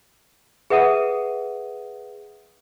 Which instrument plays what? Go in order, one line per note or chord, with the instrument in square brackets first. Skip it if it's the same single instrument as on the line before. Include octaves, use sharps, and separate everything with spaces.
[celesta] G#4 B4 E5 F#5 D#6 D#7